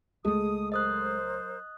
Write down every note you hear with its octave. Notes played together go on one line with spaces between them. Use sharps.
C#2 G#3 A3 A4 D#6
F#3 A#4 C5 D#5 D#6 F#6